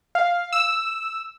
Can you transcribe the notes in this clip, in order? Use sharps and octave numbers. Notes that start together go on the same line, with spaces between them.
F5
E6